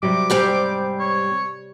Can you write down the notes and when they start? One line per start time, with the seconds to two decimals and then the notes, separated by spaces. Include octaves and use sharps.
0.03 C3 F#3 G3 D6
0.30 G#2 G3 C4 G4
1.00 C#5